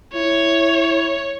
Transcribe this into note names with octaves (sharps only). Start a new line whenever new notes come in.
E4 C#5